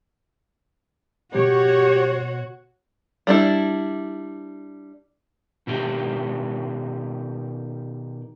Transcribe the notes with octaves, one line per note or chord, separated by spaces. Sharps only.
B2 F#4 G4 C#5
G3 D4 E4
B2 D#3 G4